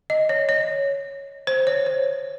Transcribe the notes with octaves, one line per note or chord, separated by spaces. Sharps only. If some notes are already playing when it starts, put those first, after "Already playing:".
D#5
C#5
C#5
C5
C#5
C5